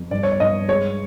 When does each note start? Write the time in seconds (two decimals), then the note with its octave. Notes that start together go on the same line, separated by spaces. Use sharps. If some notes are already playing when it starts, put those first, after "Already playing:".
Already playing: F2
0.11 G2 D5
0.23 C#5
0.32 D5
0.40 G2 D#5
0.68 G#3 C#5